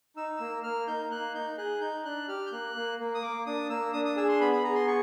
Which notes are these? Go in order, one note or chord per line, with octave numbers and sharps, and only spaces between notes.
D#4 E6
A#3
A#3 F6
D#4 G6
A#3 F#6
D#4 G6
G#4 F#6
D#4 G6
D4 F#6
G4 F6
G6
A#3 F#6
A#3
A#3
D#6
A#3 D6
D4 D#6
A#3 E6
D4 D#6
D#6
G#4 E6
C6
B3 B5
B5
G#4 A#5
C6
G#4 C#6